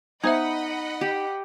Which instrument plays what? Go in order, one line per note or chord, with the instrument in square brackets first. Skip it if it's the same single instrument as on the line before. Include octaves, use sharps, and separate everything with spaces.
[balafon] B3 C5 E5 [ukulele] D#4 [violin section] D#5 F#5 B5
[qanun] G4